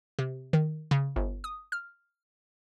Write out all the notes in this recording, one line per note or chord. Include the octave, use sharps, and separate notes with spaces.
C3
D#3
C#3
G1
D#6
F6